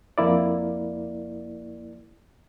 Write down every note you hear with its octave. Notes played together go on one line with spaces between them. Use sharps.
F2 A#3 E4 D5